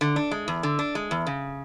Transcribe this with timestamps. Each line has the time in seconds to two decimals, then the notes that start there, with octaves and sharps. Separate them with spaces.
0.01 D3
0.16 D4
0.31 G#3
0.48 E2
0.63 D3
0.79 D4
0.95 G#3
1.11 E2
1.27 C#3